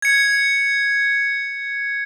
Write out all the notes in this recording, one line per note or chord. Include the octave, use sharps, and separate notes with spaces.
G#6 C#7